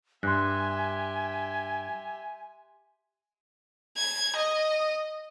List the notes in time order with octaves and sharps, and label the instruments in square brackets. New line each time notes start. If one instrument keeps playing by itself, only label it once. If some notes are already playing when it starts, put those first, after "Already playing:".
[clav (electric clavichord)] G2 [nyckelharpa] G4 E5 [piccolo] G#5 [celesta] C6 F#6
[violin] G#6
D#5